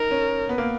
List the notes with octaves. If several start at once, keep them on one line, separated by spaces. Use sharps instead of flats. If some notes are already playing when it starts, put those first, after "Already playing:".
Already playing: D#4 A#4
C#4
B3
A#3